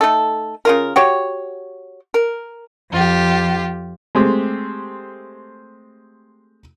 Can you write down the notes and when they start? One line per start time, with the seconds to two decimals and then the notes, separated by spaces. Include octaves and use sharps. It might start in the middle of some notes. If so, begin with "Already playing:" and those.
0.01 A3 D#4 A4
0.65 C#3 F4 A#4
0.96 F#4 G4 C#5
2.14 A#4
2.91 F2 F4 G4
4.15 G#3 A3 C4 G4